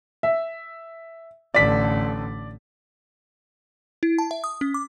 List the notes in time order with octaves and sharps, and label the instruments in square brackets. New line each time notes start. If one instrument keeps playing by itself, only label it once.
[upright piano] E5
[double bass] A1 D3 [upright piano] D5 B6
[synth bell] E4
A5
E5
D#6
C#4
D6